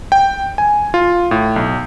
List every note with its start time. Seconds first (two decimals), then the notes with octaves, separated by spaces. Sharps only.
0.12 G5
0.58 G#5
0.94 F4
1.31 A2
1.56 B1